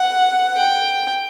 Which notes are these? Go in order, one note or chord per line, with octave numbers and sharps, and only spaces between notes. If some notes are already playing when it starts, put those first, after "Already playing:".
Already playing: F#5
G5